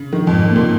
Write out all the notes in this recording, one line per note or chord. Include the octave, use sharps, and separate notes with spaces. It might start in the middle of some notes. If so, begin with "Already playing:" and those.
Already playing: C#3
D#3 F3
F2
G#2
F#2
A#3
A#2